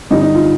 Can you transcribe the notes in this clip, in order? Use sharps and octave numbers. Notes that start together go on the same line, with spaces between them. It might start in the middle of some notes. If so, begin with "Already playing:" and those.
G2 D3 G3 D#4
D#4
F4